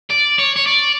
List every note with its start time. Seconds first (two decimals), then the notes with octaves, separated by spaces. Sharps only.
0.10 D5
0.38 C#5
0.56 C#5
0.66 D5